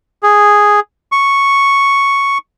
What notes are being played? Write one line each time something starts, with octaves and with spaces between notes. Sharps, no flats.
G#4
C#6